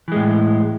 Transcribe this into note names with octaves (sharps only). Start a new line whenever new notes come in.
A2 E3 G#3